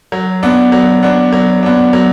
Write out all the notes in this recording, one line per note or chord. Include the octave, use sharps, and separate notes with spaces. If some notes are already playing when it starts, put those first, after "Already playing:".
F#3
B3 D4
F#3
B3 D4
F#3
B3 D4
F#3